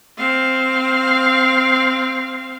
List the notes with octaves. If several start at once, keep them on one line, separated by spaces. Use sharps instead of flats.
C4 F5